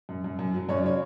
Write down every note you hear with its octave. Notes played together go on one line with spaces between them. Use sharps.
F#2
F#2
F#2
F#3
F#2 C#5
D5
C#3 C#5